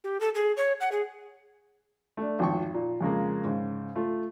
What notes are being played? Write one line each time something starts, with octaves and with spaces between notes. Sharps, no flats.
G4
A4
G#4
C#5
F#5
G#4
A3 D4
G#1 F2 G5 C#6
A#2
F2 C#3 G#3 A#3
G#2 C#3
A3 F4